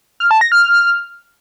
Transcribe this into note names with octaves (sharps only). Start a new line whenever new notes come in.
F6
A5
A#6
F6